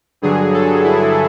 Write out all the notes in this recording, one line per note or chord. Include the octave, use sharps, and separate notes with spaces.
G2 D3 F#3 G#4
A4
E4